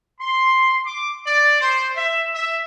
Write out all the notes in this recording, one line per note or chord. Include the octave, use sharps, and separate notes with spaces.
C6
D6
D5
C5
E5
E5